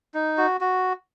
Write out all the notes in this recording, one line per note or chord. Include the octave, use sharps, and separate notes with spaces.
D#4
F#4
F#4